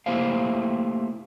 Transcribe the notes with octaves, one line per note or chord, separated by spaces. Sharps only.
A3 A#3 E4 G4 C5 F5